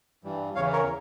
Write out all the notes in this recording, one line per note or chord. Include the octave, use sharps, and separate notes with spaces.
G2 E3 G3
E2 C#3 E3 C#5 F5
A#4 C#5